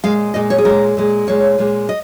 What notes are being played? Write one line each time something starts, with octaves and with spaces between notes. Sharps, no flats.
A#2 G#3 F5
A#2 G#3 D#5
C#5
G#4
A#2 G#3 A#4
A#2 G#3
A#2 G#3 C#5
A#2 G#3
D#5